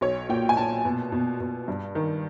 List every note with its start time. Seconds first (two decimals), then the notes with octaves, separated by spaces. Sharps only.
0.01 B1 C#5
0.29 A#2 G5
0.49 G#5
0.57 A#2 A5
0.85 B2
1.12 B2
1.40 B2
1.68 G2
1.95 D#3